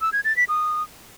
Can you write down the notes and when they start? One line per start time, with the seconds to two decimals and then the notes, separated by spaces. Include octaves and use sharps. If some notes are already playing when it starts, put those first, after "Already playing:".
0.01 E6
0.13 G#6
0.25 A6
0.37 B6
0.49 D#6